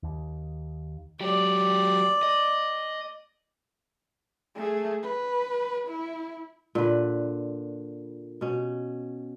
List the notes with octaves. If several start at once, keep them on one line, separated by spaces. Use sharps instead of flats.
D#2
F#3 G4 D5
D#5
A3 G#4
B4
E4
A#2 D3 B4
B2 C#4